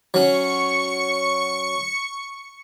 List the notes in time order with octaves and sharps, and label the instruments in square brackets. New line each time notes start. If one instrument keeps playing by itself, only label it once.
[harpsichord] F#3 C#4 [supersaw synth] C#6 C#7